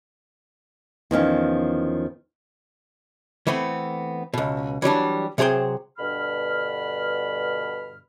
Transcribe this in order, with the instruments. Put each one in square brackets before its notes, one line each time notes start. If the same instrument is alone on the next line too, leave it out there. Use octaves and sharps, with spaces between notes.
[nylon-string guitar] E2 D#3 F3 C#4
[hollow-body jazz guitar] E3 A3 B3 C4
C#2 B2
E3 F#3 G3 D4
C3 F#3 G#4 C5 G5
[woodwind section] G2 B2 D3 B5 F6